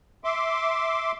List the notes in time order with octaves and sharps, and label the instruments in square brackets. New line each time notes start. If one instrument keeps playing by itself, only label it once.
[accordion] E5 C6 D6